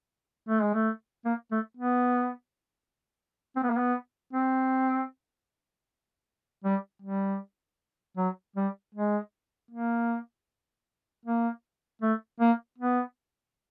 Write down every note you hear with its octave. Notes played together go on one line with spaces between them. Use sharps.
A3
G#3
A3
A#3
A3
B3
C4
B3
A#3
B3
C4
G3
G3
F#3
G3
G#3
A#3
A#3
A3
A#3
B3